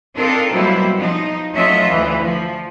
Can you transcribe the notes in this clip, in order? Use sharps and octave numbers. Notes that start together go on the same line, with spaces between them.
C4 D4 D#4 F4 A4 A#4
B2 F#3 G3 A#3 E4 C5
F3 D#4
F#3 A3 C#4 F4 D#5 E5
D2 E3
F3